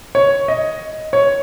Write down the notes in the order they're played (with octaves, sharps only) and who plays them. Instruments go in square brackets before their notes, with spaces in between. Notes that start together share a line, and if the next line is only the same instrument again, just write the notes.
[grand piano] C#5
D#5
C#5